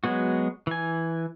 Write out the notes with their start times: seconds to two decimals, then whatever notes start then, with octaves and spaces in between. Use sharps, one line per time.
0.04 F#3 G#3 B3 F#4
0.67 E3 G#5